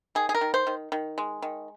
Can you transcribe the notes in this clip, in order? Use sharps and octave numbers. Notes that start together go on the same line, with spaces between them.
D#3 G#4
G#4
A#4
D#3
C5
D#3
D#3
G#3
D#3